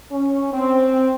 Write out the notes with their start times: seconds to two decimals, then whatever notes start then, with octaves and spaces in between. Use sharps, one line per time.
0.11 C#4
0.52 C4